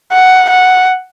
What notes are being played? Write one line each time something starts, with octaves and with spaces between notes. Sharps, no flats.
F#5
F#5